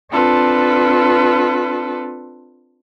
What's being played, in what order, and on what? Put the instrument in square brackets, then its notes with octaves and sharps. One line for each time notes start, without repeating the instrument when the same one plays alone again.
[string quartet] C4 D4 F4 A4 B4